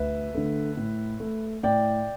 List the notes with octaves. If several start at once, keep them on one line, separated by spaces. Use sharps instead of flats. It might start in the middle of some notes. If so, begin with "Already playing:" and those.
Already playing: D2 B4 E5
D3 A3
A2
A3
A2 D5 G5